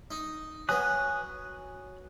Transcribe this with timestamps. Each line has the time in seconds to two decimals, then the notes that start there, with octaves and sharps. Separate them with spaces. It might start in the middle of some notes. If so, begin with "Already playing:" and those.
0.11 D#4
0.69 F#3 B3 G#5 D#6 F#6